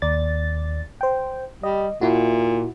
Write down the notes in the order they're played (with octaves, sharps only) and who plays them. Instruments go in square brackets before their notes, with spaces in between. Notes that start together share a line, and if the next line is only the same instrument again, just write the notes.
[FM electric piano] D#2 D5 A6
C5 G5
[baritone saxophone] G3 [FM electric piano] D#5
[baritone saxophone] A#2 [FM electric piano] E4 F#4